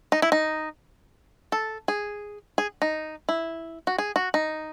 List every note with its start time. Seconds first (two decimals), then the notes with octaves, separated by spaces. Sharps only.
0.12 D#4
0.22 E4
0.32 D#4
1.52 A4
1.88 G#4
2.58 G#4
2.82 D#4
3.29 E4
3.87 F#4
3.98 G#4
4.16 F#4
4.34 D#4